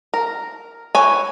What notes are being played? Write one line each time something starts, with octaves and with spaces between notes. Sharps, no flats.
A#4
E3 C#5 G#5